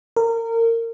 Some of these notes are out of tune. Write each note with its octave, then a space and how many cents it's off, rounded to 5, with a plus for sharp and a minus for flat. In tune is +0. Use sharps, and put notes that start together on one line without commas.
A#4 -25